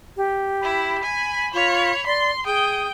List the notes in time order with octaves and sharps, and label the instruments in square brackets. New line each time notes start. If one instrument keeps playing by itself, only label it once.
[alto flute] G4
[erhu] E4 [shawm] B5
[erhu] G#5
[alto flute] F4 [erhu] C#5
[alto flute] D5 [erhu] C6
[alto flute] G#4 [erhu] G5 [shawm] D#6